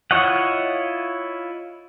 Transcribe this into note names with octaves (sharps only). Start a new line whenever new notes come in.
E4 F4 C#5 D#5 F#5